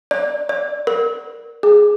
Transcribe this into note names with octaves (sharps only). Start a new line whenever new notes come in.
D5
D5
A#4
G#4